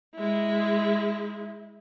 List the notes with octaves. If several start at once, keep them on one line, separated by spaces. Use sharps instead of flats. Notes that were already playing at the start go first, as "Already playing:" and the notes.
G#3 E4